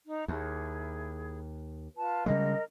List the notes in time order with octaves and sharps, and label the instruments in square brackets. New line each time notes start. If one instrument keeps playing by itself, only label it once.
[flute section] D#4
[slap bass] D#2 [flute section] E4 G#4
[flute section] F4 B4 A5
[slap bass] C#3 G3 G#3 [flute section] A#4 D#5